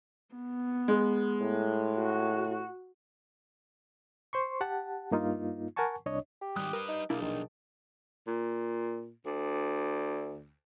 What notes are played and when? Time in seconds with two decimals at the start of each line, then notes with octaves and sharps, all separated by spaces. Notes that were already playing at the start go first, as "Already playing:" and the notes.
0.35 B3
0.88 G#3
1.41 A2
1.98 F#4
4.33 C5 C6 C#6
4.61 G4 F#5 A5
5.11 G2 A#3 D#4 F4
5.76 A#4 F#5 G#5 A5 C#6
6.06 C2 D4 C#5 D#5
6.42 G4
6.56 G#2 D#3 G3 D6 D#6 F#6
6.73 G3 A#4 B4
6.89 D#4
7.10 B1 A#3 D4 E4 G#4
7.22 A#1 D#3
8.27 A#2
9.26 D2